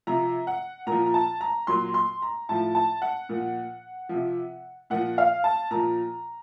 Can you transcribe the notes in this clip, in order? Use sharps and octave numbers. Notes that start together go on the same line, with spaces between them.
C3 F3 A#5
F#5
A#2 F3 A#5
A#5
A5
A#5
A#2 F#3 C6
C6
A#5
A2 F3 A5
A5
F#5
A#2 F3
C3 F3
A#2 F3 F#5
F5
A5
A#2 F3 A#5